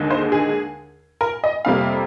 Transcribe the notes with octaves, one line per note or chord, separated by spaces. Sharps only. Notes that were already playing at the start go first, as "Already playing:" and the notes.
Already playing: D#2 D3 G#3
C5
G#4
A#4
D#5
F2 C3 G3 A#3 F5